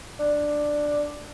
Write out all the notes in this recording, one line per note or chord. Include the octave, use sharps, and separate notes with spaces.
D4